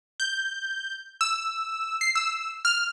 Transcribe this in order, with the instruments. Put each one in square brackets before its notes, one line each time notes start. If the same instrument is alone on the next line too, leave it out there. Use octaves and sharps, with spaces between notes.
[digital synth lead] G6
E6
C7
E6
F6